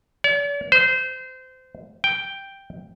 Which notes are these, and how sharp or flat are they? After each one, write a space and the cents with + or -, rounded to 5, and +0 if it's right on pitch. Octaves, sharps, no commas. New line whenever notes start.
D5 -45
C5 -25
G5 +0